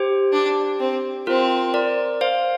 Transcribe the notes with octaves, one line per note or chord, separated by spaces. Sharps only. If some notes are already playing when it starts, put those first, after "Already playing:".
Already playing: G4 C5
D4
C4
C4 F4 A#4
A#4 D5
C5 F5